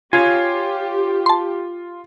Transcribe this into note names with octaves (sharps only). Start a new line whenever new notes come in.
F4 G4 C#5 F5 G#5
A5 C6